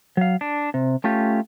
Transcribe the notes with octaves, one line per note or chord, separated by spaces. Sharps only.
F#3 F5
D4
C3
A3 C#4 F4 G4